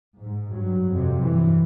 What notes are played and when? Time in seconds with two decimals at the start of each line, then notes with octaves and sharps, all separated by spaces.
0.18 G#2
0.52 G2 F#3
0.88 F2 C3
1.22 G2 E3